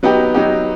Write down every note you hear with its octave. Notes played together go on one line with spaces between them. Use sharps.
F#3 B3 D#4 G4
F#3 B3 D#4 G4